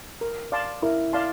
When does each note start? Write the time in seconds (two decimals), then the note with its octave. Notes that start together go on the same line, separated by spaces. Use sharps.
0.21 A#4
0.52 D5 F5 A5 C6
0.82 E4 A#4
1.13 D5 F5 A5 C6